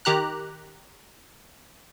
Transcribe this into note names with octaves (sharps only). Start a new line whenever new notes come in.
D#3 G4 A#5 F#6